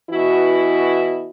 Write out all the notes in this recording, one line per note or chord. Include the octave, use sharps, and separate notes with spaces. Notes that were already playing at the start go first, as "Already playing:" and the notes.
B2 E3 E4 F#4